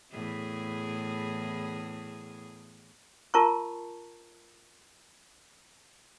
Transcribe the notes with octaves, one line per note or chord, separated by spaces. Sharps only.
E2 A2 G#4
F4 A#4 A5 A#5 C#6